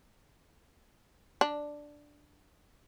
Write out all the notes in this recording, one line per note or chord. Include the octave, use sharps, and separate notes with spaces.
D4